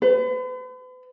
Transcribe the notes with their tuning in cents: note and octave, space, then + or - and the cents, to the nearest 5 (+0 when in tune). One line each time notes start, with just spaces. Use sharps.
B4 +45